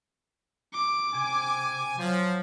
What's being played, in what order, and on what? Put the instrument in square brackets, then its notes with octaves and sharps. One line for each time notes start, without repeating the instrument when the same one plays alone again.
[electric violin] D6
[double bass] C3 [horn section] G#5
[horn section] F3 [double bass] F#3